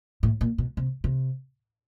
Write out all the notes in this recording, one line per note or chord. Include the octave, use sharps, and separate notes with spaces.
A2
A#2
B2
C3
C3